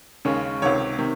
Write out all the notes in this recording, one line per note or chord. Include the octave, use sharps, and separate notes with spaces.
D#2 C#3 G#3 C#4
C#2 C3 D#3 C#5
C3 D#3